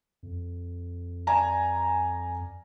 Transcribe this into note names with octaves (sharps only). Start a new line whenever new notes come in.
F2
D5 G#5 A#5